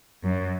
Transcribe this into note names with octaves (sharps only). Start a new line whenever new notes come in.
F#2